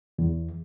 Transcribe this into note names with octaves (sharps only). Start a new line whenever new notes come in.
E2